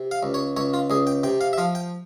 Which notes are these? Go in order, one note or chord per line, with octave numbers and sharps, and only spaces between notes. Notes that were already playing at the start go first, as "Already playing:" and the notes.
Already playing: C3
F5
C#2
C#5
C#2 C#5
F4
C#2 G#4
G5
C3 G5
F5
E5
F3 F5
G5